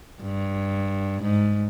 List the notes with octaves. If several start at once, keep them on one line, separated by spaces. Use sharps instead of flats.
G2
G#2